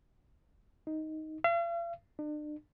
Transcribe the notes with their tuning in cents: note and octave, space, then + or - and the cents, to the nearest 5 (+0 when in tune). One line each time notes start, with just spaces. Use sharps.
D#4 +5
F5 -45
D4 +40